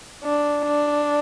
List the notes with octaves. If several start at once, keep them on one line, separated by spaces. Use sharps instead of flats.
D4
D4